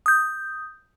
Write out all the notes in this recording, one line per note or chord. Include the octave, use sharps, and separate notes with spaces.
D#6 G6